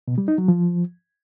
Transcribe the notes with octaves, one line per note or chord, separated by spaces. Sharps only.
B2
G3
D#4
F#3
F3